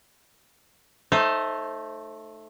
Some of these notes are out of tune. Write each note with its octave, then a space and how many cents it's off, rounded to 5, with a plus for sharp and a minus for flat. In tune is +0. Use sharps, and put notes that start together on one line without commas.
A3 +0 D#4 +0 C5 +30